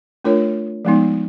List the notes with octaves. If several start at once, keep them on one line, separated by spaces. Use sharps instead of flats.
A3 D4 F4 A#4 C#5
F3 G#3 B3 D#4